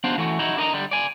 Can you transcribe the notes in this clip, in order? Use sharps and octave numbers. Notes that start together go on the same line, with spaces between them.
B3 D4 F#4 C5 F5 F#5
E3 A3 F#4
D#4 E4 F#4
D4 A#4 D#5 A#5
D3 G3
D5 G#5